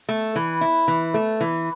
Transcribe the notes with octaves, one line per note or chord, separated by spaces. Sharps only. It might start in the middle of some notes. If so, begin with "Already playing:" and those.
A3
E3
E4
E3
A3
E3